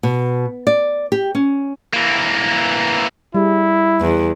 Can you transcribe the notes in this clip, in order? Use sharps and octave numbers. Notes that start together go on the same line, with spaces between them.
B2
D5
G4
C#4
E3 A#3
G3 E4 G4 G#4
E2